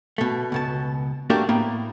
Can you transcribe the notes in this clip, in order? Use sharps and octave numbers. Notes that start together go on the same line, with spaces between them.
B2 A3
C#2 B2 A5
A3 A#3 D4 F#4 G4 A#4
A2 A#3 B3